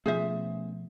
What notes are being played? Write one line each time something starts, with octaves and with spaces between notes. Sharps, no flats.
B2 F3 A3 B3 C#4 G#4 C5 E5